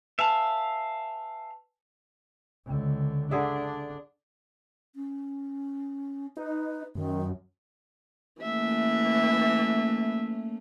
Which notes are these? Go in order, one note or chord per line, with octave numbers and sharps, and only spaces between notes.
B4 E5 F5 G#5 A5
C#2 D3
D3 D4 G#4 E5
C#4
D#4 B4
F#2 D#3
E3 A3 A#3 C#4 E5